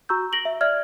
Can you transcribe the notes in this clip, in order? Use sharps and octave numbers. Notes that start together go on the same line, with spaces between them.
F#4 A#5 C#6 E6 G6
A#6 D7 F#7 G7
E5
D5 E5 F6 G#6